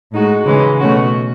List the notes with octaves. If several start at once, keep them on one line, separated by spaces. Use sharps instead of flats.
A2 G#3 D#4 F#4
C#3 E3 G#3 C#4
B2 A3 C#4 F#4